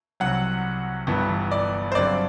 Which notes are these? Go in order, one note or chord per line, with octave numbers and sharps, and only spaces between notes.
C2 C3 F#3 F#5
G1 G2 E3 B3
D5
C5
G2 D3 F#3 C4 D5